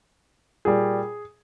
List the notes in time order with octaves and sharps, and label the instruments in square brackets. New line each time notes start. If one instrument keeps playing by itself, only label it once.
[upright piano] A#2 G3 G#4